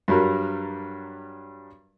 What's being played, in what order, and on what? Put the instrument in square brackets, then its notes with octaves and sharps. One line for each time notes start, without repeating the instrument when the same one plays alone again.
[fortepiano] G2 F#3 G3 A#4